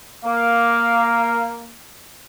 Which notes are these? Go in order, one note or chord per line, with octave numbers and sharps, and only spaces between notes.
A#3 F5